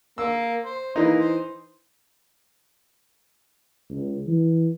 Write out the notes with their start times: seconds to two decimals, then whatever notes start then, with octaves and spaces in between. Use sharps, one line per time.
0.18 A#3 E6
0.65 C5
0.96 E3 A#3 D#4
1.19 C5
3.90 C#2
4.27 E3